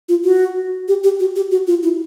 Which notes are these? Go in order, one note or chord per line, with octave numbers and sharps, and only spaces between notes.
F4
F#4
G4
G4
F#4
G4
F#4
F4
E4